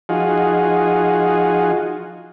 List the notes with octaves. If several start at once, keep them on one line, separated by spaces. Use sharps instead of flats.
F3 D#4 F4 F#4 G#4